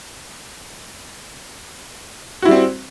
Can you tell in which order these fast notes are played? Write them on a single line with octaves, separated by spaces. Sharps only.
F#4 E4 G3 C4